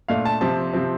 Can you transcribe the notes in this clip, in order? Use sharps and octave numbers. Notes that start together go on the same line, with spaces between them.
A#2 A3 D4 F5
A5
C3 F3 C4 A5
C3 F3 C4